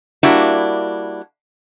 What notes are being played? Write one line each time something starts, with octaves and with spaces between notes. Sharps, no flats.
G3 A#3 D4 E4 F#4